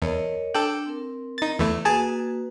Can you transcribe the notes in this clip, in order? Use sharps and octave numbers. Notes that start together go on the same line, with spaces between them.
E2 A#4 C#5 D#5
D4 A4 G5
C4 A#4
D#4 A6
E2 E3 A3
A#3 F#4 G#4 B4 G#5 A5